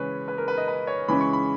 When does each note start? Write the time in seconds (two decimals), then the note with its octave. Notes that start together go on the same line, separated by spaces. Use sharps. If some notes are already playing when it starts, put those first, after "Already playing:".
Already playing: C#3 E3 G#3 C#4 B4 C#5
0.28 B4
0.38 A#4
0.48 B4
0.57 D#5
0.68 B4
0.87 C#5
1.08 C#3 E3 G#3 C#4 B5
1.21 C#6
1.33 B5